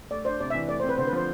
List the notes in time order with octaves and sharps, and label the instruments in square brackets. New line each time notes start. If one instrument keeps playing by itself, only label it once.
[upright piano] A3 [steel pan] D5
[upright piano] D4 [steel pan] C5
[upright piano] C3 [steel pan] D5
[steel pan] E5
[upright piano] E3
[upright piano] A3 [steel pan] D5
[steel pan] C5
[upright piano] C4
[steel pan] B4
[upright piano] D3 [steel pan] C5
[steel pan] B4
[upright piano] F3 [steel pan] C5